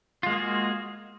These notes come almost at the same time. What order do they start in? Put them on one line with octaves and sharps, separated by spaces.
F4 G#3 A#3 G#4 F#4